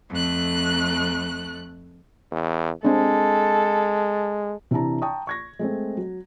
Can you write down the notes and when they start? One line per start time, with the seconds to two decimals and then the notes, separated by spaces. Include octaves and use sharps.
0.10 F2 A3 F#6
2.32 E2
2.85 G#3 C4 D4 A4
4.71 C3 E3 D4 E4 A5 A#5
5.02 G5 A5 A#5 C#6 D#6
5.27 C#6 G#6 A#6
5.59 G#3 A3 C4
5.97 F#3